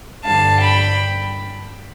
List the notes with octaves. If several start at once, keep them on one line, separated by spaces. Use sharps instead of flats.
G2 D3 G3 F5 A5
G5 B5